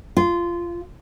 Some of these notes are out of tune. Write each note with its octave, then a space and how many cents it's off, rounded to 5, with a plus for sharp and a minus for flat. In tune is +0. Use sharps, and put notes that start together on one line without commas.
F4 -15